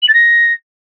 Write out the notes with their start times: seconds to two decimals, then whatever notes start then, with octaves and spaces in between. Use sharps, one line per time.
0.02 F#7
0.08 A6
0.14 A#6